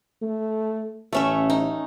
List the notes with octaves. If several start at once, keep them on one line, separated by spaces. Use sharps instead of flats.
A3
A1 A3 C#4 E5
D#4